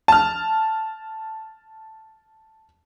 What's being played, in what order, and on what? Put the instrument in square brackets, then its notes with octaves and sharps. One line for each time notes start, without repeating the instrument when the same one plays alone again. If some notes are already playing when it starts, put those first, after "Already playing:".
[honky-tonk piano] A5 F6